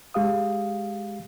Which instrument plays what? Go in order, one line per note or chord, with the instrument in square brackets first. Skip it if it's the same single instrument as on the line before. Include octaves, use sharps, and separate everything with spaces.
[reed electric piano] G#3 G4 F5 D#6